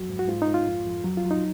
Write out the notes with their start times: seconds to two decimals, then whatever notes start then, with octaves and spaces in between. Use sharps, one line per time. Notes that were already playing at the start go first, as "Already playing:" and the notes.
Already playing: F2 F#3 F#4
0.09 G#2
0.19 F#4
0.28 G#2 F4
0.42 D#4
0.47 G#2
0.54 F4
0.67 F2
0.86 F2
1.04 F#3
1.17 F4
1.25 F#3
1.31 D#4